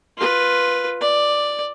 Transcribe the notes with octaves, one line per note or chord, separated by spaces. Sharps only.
F4 B4
D5